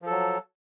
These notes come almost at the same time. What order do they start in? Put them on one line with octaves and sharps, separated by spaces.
F3 A4 F#3